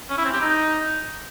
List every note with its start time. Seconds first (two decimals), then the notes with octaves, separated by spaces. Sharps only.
0.10 C#4
0.18 E4
0.25 C4
0.33 G4
0.41 D#4